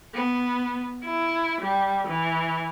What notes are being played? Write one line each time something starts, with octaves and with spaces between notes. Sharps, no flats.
B3
E4
G3
E3